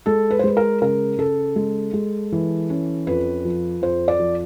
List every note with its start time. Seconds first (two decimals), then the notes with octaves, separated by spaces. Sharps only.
0.06 G#3 A4
0.31 B4
0.39 C5
0.44 G#3 B4
0.57 A#4
0.82 C#3 A#4
1.18 C#3 A4
1.56 G#3
1.94 G#3
2.32 E3
2.70 C#4
3.07 F2 B4
3.45 F3
3.82 F2 C5
4.08 D5
4.19 F3